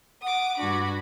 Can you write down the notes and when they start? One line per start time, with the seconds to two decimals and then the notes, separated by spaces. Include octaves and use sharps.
0.23 F#5 D6 D#6
0.57 G2 D4 F#4 B5